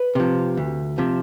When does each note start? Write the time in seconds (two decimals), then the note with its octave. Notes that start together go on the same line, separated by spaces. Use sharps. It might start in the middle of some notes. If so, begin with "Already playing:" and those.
Already playing: B4
0.15 C3 F3
0.57 D2
0.98 C3 F3